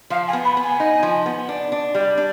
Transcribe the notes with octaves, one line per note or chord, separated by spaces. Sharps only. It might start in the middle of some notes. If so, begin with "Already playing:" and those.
F3 F5
G#5
B3
B5
B3
G#5
D#4
F3
B3
D4
D4
G3
D4